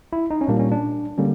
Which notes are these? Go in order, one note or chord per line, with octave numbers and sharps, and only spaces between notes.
E4
D#4
C#4
A#2 G3 A#3 D4
C#4
D4
D3 G3 A#3 C#4